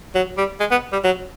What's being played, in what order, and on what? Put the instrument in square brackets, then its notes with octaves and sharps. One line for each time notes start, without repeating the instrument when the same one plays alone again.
[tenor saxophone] F#3
G3
G#3
B3
G3
F#3